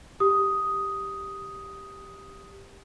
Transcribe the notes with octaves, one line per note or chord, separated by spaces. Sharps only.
G4 D#6